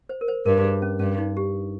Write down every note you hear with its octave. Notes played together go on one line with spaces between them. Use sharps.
C5
A#4
C5
G2 A#4
G#4
C#4
G2 C#4
D#4
G4